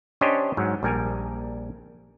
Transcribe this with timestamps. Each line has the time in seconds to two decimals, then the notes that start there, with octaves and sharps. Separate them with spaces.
0.21 C#4 D4 G4 C5 C#5 D#5
0.57 G#2 F#3
0.83 A#1 G3 A#4 G#5